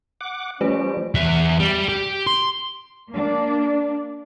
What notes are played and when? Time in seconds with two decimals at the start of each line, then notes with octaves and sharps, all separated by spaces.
0.21 F#5 D6
0.61 F3 G3 A3 C#4 B4 D7
1.15 E2 E5
1.59 G3
1.88 G4
2.26 C6
3.10 A#3 D4